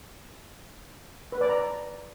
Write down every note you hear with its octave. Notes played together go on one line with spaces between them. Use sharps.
B4
D5
A#5